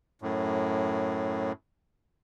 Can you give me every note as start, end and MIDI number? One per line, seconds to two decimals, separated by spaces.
0.22 1.52 42
0.22 1.52 45